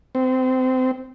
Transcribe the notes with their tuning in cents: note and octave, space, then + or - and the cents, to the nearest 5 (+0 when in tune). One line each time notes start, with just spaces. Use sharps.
C4 -25